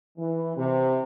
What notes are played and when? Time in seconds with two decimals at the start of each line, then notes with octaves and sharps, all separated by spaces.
0.18 E3
0.57 C3